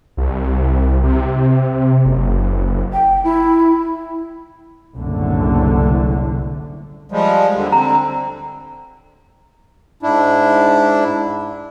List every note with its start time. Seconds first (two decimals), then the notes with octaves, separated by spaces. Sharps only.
0.17 C2
1.03 C3
2.05 F#1
2.92 G5
3.24 E4
4.95 F#1 C2 A2 D3
7.12 F3 G3 G#3
7.54 D#2 D3 G3
7.72 D3 C4 A#5
10.03 G#2 D4 E4